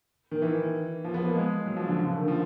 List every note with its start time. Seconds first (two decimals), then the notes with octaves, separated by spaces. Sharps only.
0.31 D#3
0.42 E3
1.04 F3
1.14 B3
1.25 A#3
1.35 G#3
1.66 F#3
1.77 F3
1.87 D3
1.97 C#3
2.07 D3
2.18 D#3
2.28 F3